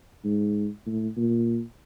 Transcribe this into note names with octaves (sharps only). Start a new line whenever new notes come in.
G#2
A2
A#2